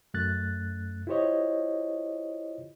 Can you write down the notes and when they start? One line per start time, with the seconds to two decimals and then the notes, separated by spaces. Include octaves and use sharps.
0.14 F#2 A3 F#6 A6
1.07 E4 F4 G4 C5 C#5 D#5